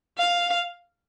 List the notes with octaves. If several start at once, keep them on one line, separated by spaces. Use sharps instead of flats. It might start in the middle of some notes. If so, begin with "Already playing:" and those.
F5